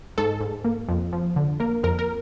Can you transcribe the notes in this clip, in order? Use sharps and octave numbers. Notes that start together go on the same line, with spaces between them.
G#2 A4
G#2
A#3
F2
F3
D3
A#3 A#4
F2 A#4
A#4